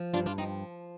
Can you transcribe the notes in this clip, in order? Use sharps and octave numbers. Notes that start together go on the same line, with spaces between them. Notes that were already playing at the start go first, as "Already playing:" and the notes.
Already playing: F3
G2 D4 F4
D4 F4
F3 C4 D#4